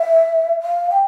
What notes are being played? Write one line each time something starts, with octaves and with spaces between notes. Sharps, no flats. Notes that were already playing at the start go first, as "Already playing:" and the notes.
Already playing: E5
F5
G5